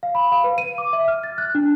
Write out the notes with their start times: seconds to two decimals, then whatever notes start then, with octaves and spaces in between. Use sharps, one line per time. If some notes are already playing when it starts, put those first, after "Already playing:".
0.03 F5
0.15 B5
0.32 F5
0.44 B4
0.58 D#7
0.78 D6
0.93 E5
1.08 F6
1.23 A6
1.38 F#6
1.55 D4